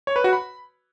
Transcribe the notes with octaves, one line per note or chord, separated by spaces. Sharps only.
C#5
B4
F#4
B5